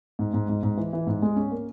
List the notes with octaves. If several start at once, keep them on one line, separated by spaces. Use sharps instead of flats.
G#2
G#2
G#2
G#2
E3
E3
G#2
G#3
C#4
A#3